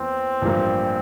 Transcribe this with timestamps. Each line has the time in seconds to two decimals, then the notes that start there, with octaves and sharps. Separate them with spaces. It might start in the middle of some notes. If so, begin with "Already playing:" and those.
Already playing: E2 E3 A#3 C4
0.42 A1 G2 F3 A#3